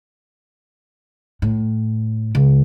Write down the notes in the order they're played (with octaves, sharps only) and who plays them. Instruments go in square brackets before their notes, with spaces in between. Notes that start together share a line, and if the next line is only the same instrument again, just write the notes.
[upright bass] A2
C#2